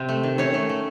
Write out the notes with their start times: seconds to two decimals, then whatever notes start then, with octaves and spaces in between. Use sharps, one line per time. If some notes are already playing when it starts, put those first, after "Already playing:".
Already playing: C3 C4 C5
0.09 A3
0.23 D#3
0.38 D#3 C#4 C#5
0.54 A3
0.69 A3